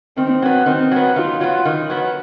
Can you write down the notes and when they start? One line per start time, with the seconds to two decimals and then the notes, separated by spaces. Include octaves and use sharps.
0.17 D#3 C4
0.42 F#3 B3
0.66 D#3 C4
0.92 F#3 B3
1.16 D#3 F4
1.41 F#3 B3
1.65 D#3
1.90 F#3 B3